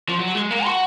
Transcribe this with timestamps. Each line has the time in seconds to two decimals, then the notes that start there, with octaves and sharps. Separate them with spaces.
0.09 F3
0.20 F#3
0.35 G#3
0.51 A#3
0.65 F#4